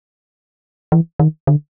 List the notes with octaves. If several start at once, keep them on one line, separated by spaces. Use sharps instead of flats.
E3
D#3
D3